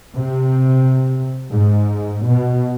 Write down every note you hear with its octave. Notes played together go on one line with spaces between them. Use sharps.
C3
G#2
B2